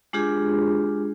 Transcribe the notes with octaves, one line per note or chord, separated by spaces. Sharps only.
G#3 D4 F4 G4 G#4